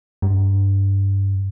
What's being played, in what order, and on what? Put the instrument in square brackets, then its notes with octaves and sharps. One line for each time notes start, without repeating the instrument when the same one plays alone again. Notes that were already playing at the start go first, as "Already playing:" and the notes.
[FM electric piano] G2